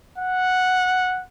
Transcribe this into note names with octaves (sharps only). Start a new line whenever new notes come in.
F#5